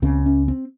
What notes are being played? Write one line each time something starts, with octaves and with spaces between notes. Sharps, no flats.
C#2 C#3 C4
C#4
C4